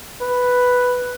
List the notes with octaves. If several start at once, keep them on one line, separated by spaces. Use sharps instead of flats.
B4